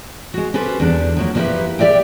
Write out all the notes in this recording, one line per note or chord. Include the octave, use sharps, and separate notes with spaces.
G#3 F#4
C#4 G4 A4 B4 C5
E2 D4
F3 F#3 A#3
F3 G3 A#3 E4 G4 B4
G4 A4 D5 E5 G5